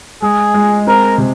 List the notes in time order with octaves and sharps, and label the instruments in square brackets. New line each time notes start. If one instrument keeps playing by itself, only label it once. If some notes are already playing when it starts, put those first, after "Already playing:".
[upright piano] G#3 [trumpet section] G#4
[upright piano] G#3
[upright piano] C4 [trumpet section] A#4
[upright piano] C3